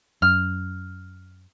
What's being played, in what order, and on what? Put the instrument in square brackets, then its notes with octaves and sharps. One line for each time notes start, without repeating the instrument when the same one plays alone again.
[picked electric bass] F#2 [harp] F6